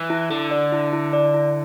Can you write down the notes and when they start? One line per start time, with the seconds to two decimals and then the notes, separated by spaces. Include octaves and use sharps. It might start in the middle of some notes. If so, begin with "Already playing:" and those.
Already playing: E3
0.10 E4
0.30 D3 A4
0.51 D5
0.72 E4
0.93 E4
1.13 D5
1.34 E4